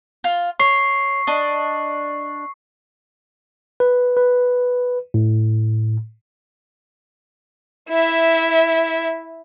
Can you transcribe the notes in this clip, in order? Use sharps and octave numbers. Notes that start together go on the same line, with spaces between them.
F4
C#5 C#6 C7
D4 D#5
B4
B4
A2
E4 E5